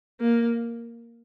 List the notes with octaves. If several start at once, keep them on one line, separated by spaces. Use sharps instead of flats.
A#3